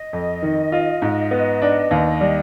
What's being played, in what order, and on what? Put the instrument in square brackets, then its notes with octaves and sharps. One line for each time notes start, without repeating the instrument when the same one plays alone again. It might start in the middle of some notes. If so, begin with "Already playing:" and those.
Already playing: [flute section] D#5
[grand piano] F2
D#3
F4
G#2
B3
D4
D#2
G3